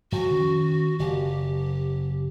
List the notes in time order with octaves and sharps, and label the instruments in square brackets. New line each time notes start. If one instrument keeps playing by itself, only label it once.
[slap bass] F2 [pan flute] F#4
[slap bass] D#3 C#4
[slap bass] F#1 [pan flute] G4